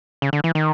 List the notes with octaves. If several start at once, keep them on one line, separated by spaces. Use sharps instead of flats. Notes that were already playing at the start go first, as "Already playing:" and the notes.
C#3
D3
E3
D#3